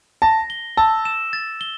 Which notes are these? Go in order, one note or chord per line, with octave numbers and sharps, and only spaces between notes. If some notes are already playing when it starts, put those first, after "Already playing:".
A5 A#6
G7
A5 E6
E7
A6
G7